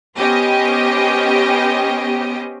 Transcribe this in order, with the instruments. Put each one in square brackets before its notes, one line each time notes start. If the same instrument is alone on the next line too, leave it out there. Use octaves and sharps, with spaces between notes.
[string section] B3 C#4 G4 C5 D#5 G5